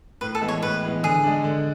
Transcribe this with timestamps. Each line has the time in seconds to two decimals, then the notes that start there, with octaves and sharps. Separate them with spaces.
0.21 A2 B4
0.35 A4
0.42 E3 G#3 B3
0.48 C#5
0.62 A2 B4
0.83 E3 G#3 B3
1.03 D3 G#4
1.23 G#3 D4
1.44 D3